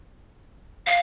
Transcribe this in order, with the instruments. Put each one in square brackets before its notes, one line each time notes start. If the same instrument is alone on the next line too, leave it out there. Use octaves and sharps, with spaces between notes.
[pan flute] F5